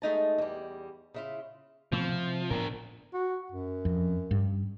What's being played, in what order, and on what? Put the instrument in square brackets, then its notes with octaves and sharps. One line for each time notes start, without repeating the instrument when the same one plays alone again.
[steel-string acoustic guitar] G#3 A3 D#4 A5
E2 G3
C#3 E4 F4
[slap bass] B2 A3 C4 [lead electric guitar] F3
[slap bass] C3
[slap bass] A2 B3 [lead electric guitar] D4 A#4
[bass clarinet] F#4
F#2
[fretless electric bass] F2
G2